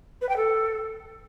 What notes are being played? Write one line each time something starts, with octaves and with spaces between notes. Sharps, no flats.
B4
G5
A4